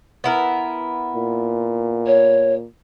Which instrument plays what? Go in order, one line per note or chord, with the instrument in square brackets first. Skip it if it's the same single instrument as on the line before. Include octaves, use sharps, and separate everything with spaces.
[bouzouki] B3 E4 A#4
[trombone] A#2
[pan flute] C#5